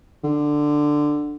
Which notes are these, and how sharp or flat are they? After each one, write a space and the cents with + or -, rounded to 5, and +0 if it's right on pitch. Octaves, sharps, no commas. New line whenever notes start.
D3 +10